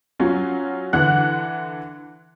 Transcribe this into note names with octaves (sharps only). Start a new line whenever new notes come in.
F#3 C#4 F4
D3 E3 F#5 F#6